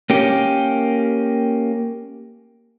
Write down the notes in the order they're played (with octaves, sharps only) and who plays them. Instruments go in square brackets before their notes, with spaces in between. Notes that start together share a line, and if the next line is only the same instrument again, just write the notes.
[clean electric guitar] A#3 C#4 G4